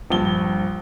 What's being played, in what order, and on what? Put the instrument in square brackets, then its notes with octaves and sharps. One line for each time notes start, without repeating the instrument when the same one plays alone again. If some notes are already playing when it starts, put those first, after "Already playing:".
[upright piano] A#1 G2 G7